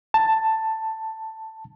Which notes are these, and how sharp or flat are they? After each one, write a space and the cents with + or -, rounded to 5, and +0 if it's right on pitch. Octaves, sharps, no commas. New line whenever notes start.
A5 +10